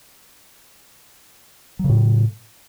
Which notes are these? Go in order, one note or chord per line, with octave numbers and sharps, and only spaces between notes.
A2 C#3 F#3